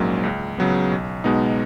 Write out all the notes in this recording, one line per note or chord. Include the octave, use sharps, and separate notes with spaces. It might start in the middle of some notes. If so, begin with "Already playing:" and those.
Already playing: A#1 G#2 F#3 A#3 C#4
C#2
C#3 F#3 B3
B1
B2 G#3 B3 D#4